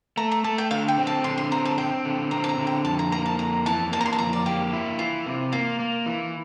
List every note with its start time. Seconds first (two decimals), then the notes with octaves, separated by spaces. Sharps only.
0.17 A3 A#5
0.31 A#5
0.44 A3 A5
0.58 G5
0.71 D3 F5
0.88 G5
0.98 C4
1.07 A5
1.24 D3 C6
1.38 C6
1.51 C4 A#5
1.65 A5
1.78 C4 G5
2.05 D3
2.31 C4 A#5
2.44 A5
2.49 A#5
2.58 D3
2.67 G5
2.85 F2 A5
2.99 A#5
3.12 A#3 A#5
3.26 A5
3.39 F2 A#5
3.66 E3 A5
3.92 A#3 A5
4.01 A#5
4.06 C6
4.13 A5
4.18 F2 A#5
4.33 D5
4.46 A#3 G4
4.73 E4
4.99 E3 F4
5.26 C3
5.52 A#3 F4
5.79 A#3
6.06 E3